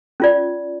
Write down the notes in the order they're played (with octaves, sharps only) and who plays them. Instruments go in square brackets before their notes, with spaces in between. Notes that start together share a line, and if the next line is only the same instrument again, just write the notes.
[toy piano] C#4 F4 D5